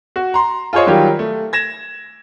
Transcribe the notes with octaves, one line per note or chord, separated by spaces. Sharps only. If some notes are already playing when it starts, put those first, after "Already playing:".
F#4
A#5 C6
F4 G#4 C5 C#5 D#5
D#3 F#3 G3 F4 G4
A3
G#6 A#6 E7